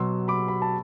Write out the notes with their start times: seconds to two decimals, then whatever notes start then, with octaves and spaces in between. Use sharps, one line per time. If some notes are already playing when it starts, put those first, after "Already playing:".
Already playing: B2 F#3 C6 E6
0.28 B5 D6
0.48 B5
0.62 A5